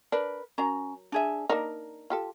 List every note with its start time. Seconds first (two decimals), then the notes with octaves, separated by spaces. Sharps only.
0.12 D4 A#4 B4
0.58 F#3 C#4 A#4 A#5
1.12 D4 G#4 E5
1.49 A#3 D4 D#4 A#4
2.10 F4 G4 A4